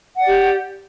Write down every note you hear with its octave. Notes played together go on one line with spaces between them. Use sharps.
G4 D5 F#5